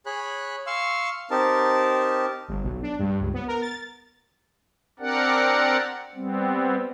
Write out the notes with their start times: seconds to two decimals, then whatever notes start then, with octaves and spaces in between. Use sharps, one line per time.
0.06 G#4 C#5 B5 F#6
0.67 F5 C6 C#6 E6
1.31 C4 D#4 G4 A#4 A5
2.48 G1
2.63 B1
2.83 D4
2.99 G2
3.21 C#2
3.34 B3
3.48 A#4
3.62 A6
5.00 C4 D4 G4 A#4 D5 F#5
6.15 G3 B3 C4